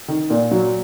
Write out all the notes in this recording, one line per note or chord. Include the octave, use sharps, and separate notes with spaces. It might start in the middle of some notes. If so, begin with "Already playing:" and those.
D#3
A#2
F#3